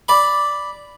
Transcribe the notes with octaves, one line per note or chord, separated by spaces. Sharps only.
D5 B5